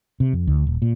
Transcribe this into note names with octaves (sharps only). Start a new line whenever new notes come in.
C3
F2
D2
D#1
A#2